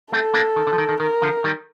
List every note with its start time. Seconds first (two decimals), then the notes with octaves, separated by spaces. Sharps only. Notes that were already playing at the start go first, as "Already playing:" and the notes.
0.12 A3 C4 A4
0.34 A#3 D4
0.56 D#3
0.67 D3
0.73 F3
0.78 D#3
0.89 D#3
1.00 D#3 A#4
1.22 D3 F3
1.44 D#3 G3